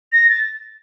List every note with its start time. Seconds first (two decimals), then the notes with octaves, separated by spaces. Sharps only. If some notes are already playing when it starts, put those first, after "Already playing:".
0.12 A#6
0.29 A6